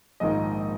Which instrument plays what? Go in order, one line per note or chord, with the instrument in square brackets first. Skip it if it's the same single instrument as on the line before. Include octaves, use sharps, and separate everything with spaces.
[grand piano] A#1 G#2 D#3 A#3 D#5